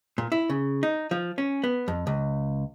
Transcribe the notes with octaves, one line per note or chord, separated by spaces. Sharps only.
A#2
E4
C#3
D#4
F3
C#4
B3
F2
C#2